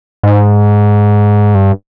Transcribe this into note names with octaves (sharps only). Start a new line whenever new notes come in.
G#2
G2